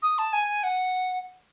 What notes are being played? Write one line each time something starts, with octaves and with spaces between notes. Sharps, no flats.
D#6
A5
G#5
F#5